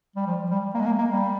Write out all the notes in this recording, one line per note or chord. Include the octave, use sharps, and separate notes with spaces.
G3
F3
G3
A#3
G#3
A#3
A#3
G3